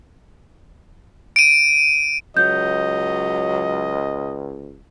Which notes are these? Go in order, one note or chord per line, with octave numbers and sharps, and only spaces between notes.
D7 D#7
C#2 F#3 D#5 G6